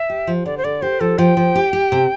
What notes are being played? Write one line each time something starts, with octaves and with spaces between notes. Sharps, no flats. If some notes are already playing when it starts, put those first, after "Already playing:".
Already playing: E5
G4
F3
D3 D5
C5
D3 D5
G4 C5
F3 A4
F3 G5
F3
G4
G4
C3